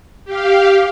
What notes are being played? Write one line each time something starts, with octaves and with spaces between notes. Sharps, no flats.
G4 F5